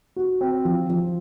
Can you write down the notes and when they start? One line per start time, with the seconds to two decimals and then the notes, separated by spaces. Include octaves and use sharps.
0.16 F#4
0.41 C4
0.65 F3
0.90 F3